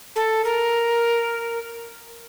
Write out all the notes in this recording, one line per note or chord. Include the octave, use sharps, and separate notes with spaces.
A4
A#4